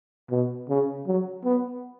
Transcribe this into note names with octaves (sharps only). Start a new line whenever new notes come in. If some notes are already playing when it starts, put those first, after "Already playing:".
B2
C#3
F#3
B3